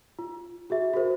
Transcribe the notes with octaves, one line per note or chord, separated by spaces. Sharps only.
F4
F#4 G#4 E5
F#4 G#4 A#4 C5